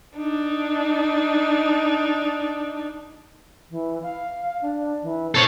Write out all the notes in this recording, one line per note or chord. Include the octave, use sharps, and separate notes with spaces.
D4 D#4
E3
F5
D4
E3
C4 A4 C#5